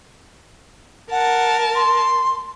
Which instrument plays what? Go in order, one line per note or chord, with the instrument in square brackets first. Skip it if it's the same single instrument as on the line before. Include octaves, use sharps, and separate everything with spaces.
[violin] A#4 A5 [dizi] F#5
[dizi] C6